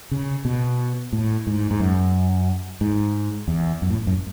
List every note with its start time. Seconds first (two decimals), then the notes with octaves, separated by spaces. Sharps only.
0.11 C#3
0.45 B2
1.13 A2
1.47 G#2
1.71 G#2
1.80 F#2
2.81 G#2
3.48 E2
3.82 F#2
3.90 A2
4.07 F#2